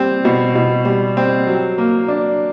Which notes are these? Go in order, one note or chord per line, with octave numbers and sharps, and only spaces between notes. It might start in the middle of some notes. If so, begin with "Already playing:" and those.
Already playing: G3 C4
B2
B2
G3
C4
F#3
A#3
D4